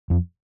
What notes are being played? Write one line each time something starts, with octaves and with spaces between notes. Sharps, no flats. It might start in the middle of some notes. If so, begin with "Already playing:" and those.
F2